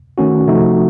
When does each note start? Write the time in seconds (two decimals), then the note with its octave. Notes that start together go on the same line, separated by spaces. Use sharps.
0.18 D#3 A3 C#4 F#4
0.47 C3 F3 A3 D#4 F#4